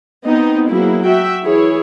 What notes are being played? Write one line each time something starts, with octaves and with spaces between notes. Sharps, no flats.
B3 C4 D#4 D#5
F#3 A#3 E4 G#4
F#4 E5 G5
E3 E4 G#4 C#5